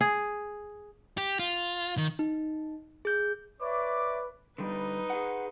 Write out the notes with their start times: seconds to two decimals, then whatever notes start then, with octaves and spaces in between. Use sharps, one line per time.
0.01 G#4
1.18 G4
1.39 F4
1.98 D#3
2.19 D#4
3.05 G#4 G6
3.61 B4 C#5 D5 E5 D6
4.58 D3 G3 D#4 B4
5.10 G#4 F#5